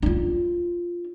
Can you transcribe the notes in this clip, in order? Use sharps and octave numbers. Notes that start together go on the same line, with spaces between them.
D4 F4